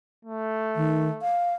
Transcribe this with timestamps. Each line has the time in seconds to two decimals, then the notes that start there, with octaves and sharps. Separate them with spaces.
0.25 A3
0.76 D#3
1.22 F5